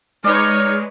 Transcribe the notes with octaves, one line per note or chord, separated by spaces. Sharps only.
G#3 D#4 B4 C#5 D5 F6